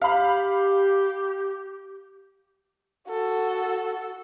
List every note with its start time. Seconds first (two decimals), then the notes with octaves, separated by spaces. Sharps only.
0.02 G4 F5 B5
3.09 F#4 A4